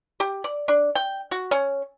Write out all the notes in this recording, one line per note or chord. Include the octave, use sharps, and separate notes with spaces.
G4
D5
D4
G5
F#4
C#4